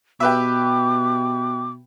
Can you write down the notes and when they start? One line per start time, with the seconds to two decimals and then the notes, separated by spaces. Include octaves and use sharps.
0.20 B2 G4 B4 E5 D6